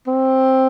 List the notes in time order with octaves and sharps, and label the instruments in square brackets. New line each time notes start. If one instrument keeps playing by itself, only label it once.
[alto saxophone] C4